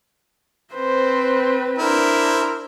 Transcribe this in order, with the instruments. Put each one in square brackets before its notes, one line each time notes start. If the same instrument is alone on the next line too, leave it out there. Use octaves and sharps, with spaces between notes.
[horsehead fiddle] C4 B4 [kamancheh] C5
[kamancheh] D4 A#4 [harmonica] E4 C5